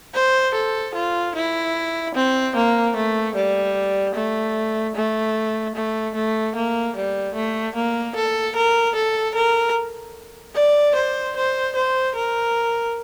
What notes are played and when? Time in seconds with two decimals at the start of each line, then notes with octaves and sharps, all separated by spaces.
0.14 C5
0.54 A4
0.94 F4
1.35 E4
2.14 C4
2.55 A#3
2.95 A3
3.35 G3
4.15 A3
4.95 A3
5.75 A3
6.15 A3
6.55 A#3
6.96 G3
7.35 A3
7.75 A#3
8.15 A4
8.55 A#4
8.95 A4
9.35 A#4
10.55 D5
10.95 C5
11.36 C5
11.75 C5
12.15 A#4